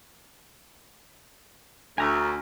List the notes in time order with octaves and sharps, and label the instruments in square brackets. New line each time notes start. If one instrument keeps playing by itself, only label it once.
[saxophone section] D2 [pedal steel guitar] G#5 A#5 C#6